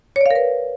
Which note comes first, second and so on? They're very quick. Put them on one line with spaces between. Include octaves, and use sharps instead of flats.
C#5 D5 F5 A#4 B4